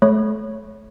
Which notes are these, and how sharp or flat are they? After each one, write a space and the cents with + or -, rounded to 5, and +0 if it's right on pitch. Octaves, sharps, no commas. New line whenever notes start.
A3 -30 C#5 +0